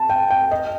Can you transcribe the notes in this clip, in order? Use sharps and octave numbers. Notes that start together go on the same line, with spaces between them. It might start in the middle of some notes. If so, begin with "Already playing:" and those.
Already playing: A5
G5
G5
D#5